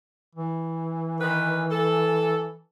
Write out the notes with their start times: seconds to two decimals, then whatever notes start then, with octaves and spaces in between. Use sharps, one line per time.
0.35 E3
1.20 D#3 B4
1.71 A4